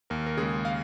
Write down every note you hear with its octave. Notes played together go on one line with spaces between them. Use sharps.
D#2 A#4
A#4
C#3 G#3 G#4
F5